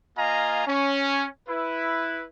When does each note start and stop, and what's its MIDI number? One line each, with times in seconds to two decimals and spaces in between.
0.17 0.66 58
0.17 0.66 65
0.17 0.66 75
0.17 0.66 77
0.17 0.66 80
0.17 0.66 82
0.67 1.26 61
1.48 2.25 64
1.48 2.25 71